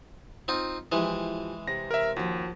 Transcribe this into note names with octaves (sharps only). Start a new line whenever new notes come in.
C4 D#4 F4
E3 F3 G#3 E4 G4
C3 A#6
A#4 E5
D#2 F3 F#4